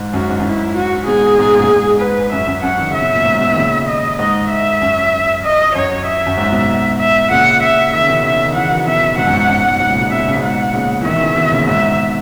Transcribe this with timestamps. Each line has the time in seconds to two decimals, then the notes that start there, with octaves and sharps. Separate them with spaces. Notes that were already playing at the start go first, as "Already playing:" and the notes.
Already playing: G#2
0.13 F#2 F#4
0.29 G#2
0.40 F#2 E4
0.51 G#2
0.76 F#4
1.07 G#2 B2 G#4
1.38 G#2 B2
1.59 F#2 A#2
1.70 G#2
2.00 G#2 B4
2.32 F#2 E5
2.47 F#2
2.63 F#2 F#5
2.77 D#3
2.89 C#3 E5
3.01 B2
3.13 A#2
3.25 G#2
3.41 G#2 B2
3.52 D#3
3.57 A#2 C#3
3.87 D#5
4.19 G#2 D#5
4.50 E5
4.81 F#2
5.44 D#5
5.75 F#2 C#5
6.07 E5
6.26 F#2
6.37 G#2
6.52 G#2 B2
6.99 E5
7.31 A#2 C#3 F#5
7.62 E5
7.93 D#3 E5
8.01 C#3
8.08 B2 D#3
8.25 E5
8.33 C#3
8.44 D#3
8.55 C#3 E3 F#5
8.71 D#3 F#3
8.87 B2 D#3 E5
9.18 G#2 B2 F#5
9.27 F#2
9.34 G#2
9.49 F#2
9.65 G#2
9.80 G#2 B2
9.90 A#2 C#3
10.01 B2
10.10 C#3 E5
10.18 B2
10.27 C#3
10.35 G#2 B2
10.43 F#5
10.73 A#2 C#3
11.01 E3
11.04 B2 D#3 E5
11.16 D#3
11.21 C#3 E3
11.36 B2 D#3
11.51 A#2 C#3
11.67 G#2 B2 E5